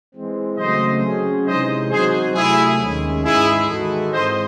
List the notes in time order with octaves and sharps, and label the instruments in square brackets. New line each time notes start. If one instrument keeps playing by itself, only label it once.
[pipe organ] E3 G#3 C4
[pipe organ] C#3 F#3 A3 C4 [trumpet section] C5 D#5
[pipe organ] F#3 C#4 G#4
[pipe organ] C3 E3 G#3 D#4 [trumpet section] C5 D#5
[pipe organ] F#3 C4 D#4 F#4 [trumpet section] G#4 C5
[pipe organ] C3 F#3 A3 [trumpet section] E4 G#4
[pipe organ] D#2 D#3 G#3 C#4
[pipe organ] G#2 E3 G#3 D#4 [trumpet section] E4 G#4
[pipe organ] D#3 G#3 D#4 F#4 A4
[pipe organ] G#2 E3 G#3 C4 [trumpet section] C5 D#5